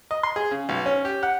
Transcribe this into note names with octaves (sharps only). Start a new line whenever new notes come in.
D#5
C6
G#4
C#3
B1
C#4
G4
F#5